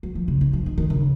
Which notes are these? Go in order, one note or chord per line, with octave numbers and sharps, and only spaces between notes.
F#3
F3
C#3
D#3
F3
D#3
D#3
C#3